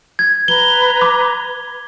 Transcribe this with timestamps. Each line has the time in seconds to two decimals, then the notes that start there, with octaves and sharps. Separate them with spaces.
0.19 G#6
0.48 B4 A#5 G7
1.02 D6